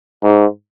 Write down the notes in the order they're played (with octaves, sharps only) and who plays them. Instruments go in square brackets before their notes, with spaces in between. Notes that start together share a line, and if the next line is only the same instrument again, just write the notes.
[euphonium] G#2